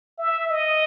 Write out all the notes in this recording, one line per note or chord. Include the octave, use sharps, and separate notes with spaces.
E5
D#5